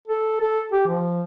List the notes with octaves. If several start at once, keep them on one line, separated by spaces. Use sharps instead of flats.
A4
A4
G4
F3